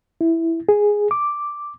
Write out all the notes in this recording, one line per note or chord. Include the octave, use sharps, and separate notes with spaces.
E4
G#4
D6